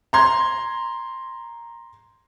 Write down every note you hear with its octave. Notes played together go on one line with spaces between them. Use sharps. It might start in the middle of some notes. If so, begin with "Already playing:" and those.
A#5 C6 G#6